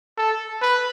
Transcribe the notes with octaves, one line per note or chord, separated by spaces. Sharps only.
A4
B4